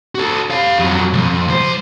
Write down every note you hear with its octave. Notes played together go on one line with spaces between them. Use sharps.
F#4 A4
G4 F5
F2 F#3
C2 F2
C#2 C5